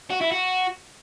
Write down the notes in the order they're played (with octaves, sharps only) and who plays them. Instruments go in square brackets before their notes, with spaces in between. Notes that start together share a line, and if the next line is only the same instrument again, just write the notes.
[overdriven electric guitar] F#4
E4
F#4